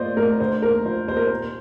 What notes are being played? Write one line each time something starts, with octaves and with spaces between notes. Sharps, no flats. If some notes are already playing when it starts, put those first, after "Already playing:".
Already playing: A2 F3 A#3 C5 D5 D#5
A2 A#4
D3 C5
D#2 A#4
F3 C5
D#2 C5
A#4
A#2 C5